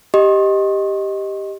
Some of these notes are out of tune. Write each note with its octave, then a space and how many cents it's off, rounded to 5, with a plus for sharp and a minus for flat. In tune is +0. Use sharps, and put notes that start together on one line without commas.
G4 +0 D#5 +0 C6 +40